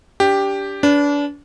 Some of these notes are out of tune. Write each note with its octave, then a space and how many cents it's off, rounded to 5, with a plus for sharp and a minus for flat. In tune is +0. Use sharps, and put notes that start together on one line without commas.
D4 -30 G4 +5
D4 -30 B4 +0